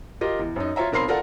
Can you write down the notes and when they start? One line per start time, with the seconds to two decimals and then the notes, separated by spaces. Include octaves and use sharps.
0.21 F4 G4 A#4 D#5
0.39 E2
0.56 F#2 D#4
0.76 F4 C#5 E5 A#5
0.92 B1 C4 A#4 B5 C6 C7
1.08 F4 A4 A#4 D5 F5 F#5